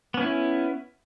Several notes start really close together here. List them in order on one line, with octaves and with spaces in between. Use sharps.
B3 C#4 E4